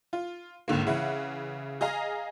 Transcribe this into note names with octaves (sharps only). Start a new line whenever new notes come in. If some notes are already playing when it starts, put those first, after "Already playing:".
F4
G#1 C#2 D3 A#3
C#3 E3 E4 F#5
G#4 D#5 F5 A#5